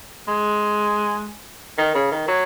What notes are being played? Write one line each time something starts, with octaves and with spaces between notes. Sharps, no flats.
G#3
D#3
C#3
D#3
F#3